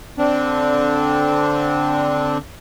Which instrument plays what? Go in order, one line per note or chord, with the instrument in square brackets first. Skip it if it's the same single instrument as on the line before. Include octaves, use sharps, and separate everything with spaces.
[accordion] D3 C4 D4